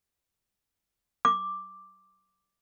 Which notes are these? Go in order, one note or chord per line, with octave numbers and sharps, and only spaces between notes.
D6